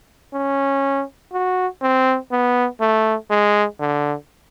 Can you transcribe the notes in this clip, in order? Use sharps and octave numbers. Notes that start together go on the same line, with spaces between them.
C#4
F#4
C4
B3
A3
G#3
D3